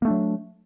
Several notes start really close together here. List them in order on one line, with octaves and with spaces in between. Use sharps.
A#3 A3 D4 F#3